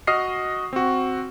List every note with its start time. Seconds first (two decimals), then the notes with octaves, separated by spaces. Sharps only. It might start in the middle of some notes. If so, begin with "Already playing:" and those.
0.07 F#4 D#5 D#6 F6 C7
0.73 C4 F#4